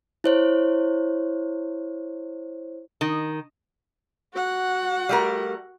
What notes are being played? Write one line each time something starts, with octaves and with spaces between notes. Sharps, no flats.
E4 C5 C#5
D#3
F#4 F#5
G3 A3 A#4